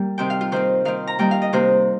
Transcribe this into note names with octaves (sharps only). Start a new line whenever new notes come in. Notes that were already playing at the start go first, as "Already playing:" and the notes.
Already playing: G3 A#3
C3 D#3 C4 G5
F5
F4
D#3 C4 C5
D#3 C4 F5
A#5
D#3 G3 A#3 G5
F5
D#5
C3 D#3 A#3 C5